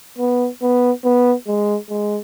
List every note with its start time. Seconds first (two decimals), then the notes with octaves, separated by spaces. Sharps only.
0.18 B3
0.62 B3
1.04 B3
1.48 G#3
1.90 G#3